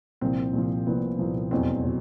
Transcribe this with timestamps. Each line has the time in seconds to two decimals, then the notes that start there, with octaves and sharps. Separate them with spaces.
0.21 C2 A#2 F3 C4
0.53 C2 A#2 F3
0.87 C2 A#2 F3 B3
1.19 C2 A#2 F3
1.51 F1 E2 B2 F#3 C4
1.84 B2 F#3